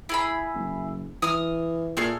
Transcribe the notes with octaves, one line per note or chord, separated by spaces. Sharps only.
E4 G#4 B5
F#1
E3 D#6 F6
A#2 A3 G#4 F6